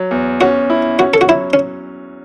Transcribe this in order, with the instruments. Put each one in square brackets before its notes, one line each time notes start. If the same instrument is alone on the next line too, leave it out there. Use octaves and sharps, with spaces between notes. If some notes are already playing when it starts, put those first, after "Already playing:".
Already playing: [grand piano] F#3
E2
[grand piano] C#4 [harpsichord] F#4
[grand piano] E4
[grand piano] C#4 [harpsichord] F#4
[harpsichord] A4
F#4
[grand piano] F#3 [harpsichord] E4
[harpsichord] C#4